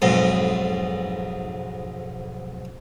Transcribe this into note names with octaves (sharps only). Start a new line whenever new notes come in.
B1 F2 G#2